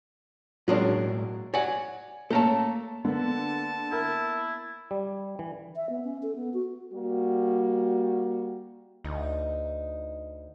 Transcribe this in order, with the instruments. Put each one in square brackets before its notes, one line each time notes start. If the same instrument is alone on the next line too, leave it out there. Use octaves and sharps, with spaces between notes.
[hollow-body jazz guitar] A2 G#3 A#3 [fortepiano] F#3 C#4 D4
[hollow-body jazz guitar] C#5 F#5 [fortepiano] D5 G#5
[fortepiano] A3 A#3 C#4 [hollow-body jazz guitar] A4 A#4 A5
[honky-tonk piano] D3 [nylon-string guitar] A#3 B3 [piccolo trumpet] A5
[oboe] E4 [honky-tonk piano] A#4
[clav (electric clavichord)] G3
E3
[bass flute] E5
B3
C#4
A4
B3
F#4
[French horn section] G3 A#3 F#4
[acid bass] D2 [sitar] D#4